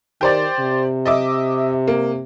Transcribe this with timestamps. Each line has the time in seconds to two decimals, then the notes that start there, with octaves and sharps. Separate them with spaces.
0.21 D#3 G4 C5 D5
0.60 C3
1.06 D#5 E5 D6
1.88 A#3